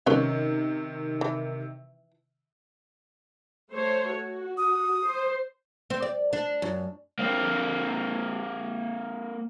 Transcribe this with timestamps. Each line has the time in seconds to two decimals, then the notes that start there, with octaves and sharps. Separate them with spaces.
0.06 C3 D#3 C#4 B4 F5
1.21 E3
3.70 A3 C5 C#5
4.10 F#4
4.58 D#6
5.05 C5
5.90 C4
6.02 D5
6.33 D4
6.62 F#2
7.19 A#3 C4